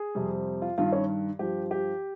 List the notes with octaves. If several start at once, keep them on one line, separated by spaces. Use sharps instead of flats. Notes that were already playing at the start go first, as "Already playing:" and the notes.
Already playing: G#4
F2 C3 G3
F4
G2 D#3 G3 F4
C#4
G2 F3 G4
G4